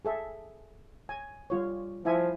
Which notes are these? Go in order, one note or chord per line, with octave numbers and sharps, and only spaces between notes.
G#4 A4 E5
G#5
G3 F4 C#5
F3 E4 E5 G#5